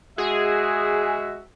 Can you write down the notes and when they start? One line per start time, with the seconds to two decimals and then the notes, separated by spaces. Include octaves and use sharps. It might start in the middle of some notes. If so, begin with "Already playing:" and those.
0.18 G#3 F#4 G#4 E5